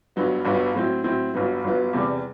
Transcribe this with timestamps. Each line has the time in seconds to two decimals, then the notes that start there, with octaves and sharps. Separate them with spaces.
0.16 G1 G2 F#3 B3
0.45 G1 G2 F#3 B3
0.75 A2 F#3 C4 E4
1.04 A2 F#3 C4 E4
1.34 G1 G2 F#3 B3
1.64 G1 G2 F#3 B3
1.93 E2 C3 G3